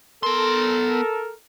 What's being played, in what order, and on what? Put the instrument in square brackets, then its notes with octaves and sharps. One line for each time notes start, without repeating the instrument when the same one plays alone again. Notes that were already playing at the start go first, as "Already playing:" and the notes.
[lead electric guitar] B3 C6 [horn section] A4 A#4